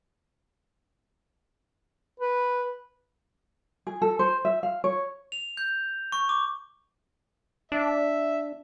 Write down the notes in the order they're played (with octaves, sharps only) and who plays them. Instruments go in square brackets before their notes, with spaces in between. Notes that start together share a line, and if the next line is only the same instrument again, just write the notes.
[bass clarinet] B4
[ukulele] G#4
A4
C5
E5
F5
C#5
[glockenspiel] F7
G6
C#6
D6
[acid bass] D4 [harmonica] E5